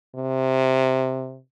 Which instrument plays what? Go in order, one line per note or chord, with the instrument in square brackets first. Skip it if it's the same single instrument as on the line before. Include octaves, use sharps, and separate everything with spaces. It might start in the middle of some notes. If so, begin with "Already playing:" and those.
[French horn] C3